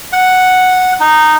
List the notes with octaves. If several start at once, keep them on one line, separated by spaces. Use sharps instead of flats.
F#5
D#4